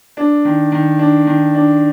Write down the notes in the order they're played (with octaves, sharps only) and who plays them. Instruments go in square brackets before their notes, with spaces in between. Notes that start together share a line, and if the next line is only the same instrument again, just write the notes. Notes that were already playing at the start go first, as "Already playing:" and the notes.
[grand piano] D4
D#3
D#3
D4
D#3
D4